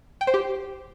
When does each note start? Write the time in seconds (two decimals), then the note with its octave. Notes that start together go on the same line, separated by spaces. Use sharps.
0.21 G5
0.27 C5
0.34 G4